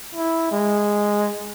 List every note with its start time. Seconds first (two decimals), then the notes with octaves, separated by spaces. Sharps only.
0.15 E4
0.52 G#3